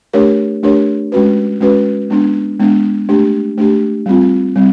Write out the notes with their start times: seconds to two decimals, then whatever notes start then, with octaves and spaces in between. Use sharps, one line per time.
0.13 A3 D4 G4 A#4 C#5
0.63 A3 D4 G4 A#4 C#5
1.12 G#3 C#4 F#4 B4
1.61 G#3 C#4 F#4 B4
2.10 G#3 B3 D4
2.60 G#3 B3 D4
3.09 A3 D4 G4
3.58 A3 D4 G4
4.06 G3 C4 F4
4.56 G3 C4